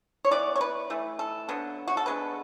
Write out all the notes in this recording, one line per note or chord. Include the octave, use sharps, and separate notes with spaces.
C#5
E3 B3 D5
C#5
B4
E3 A3
A4
D3 F#3 B3
F#4
A4
D3 G#3 B3 B4